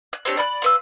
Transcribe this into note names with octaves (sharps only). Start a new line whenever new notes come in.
F#6
C4 D4 G4 C#5
D5 B5 F#6
F4 B4 E6